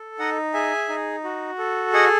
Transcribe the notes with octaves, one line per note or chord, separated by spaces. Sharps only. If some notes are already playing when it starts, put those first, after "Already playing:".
Already playing: A4
D#4 D#5 F#5
G#4 E5 G#5
D#4
F#4
A4
G#4 D#5 F#5